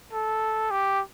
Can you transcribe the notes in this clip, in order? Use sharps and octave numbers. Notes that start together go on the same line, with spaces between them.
A4
G4